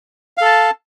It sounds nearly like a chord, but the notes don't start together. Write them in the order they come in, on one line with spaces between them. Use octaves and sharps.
F5 A4 A5